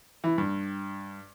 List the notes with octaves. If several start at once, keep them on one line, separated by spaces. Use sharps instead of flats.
E3
G2